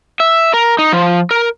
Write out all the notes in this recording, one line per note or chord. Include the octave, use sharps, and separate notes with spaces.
E5
A#4
D#4
F3
A#4